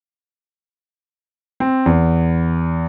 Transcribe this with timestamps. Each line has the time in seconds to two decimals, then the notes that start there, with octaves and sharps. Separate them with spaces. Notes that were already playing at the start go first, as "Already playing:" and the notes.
1.60 C4
1.86 E2